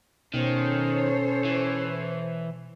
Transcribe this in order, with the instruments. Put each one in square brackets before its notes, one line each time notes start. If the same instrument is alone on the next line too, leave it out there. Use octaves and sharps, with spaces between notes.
[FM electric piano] B2 [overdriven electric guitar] D#3 [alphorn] C#4 [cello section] A4 C5 C#5
[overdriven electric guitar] E3